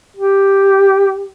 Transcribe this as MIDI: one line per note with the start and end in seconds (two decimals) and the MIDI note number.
0.17 1.29 67